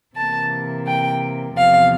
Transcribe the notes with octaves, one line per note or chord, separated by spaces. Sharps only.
C3 E3 A#3 A5
G5
E2 C3 F3 F5